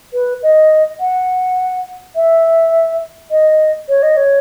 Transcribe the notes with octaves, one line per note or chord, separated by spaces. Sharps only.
B4
D#5
F#5
E5
D#5
C#5
D#5
C#5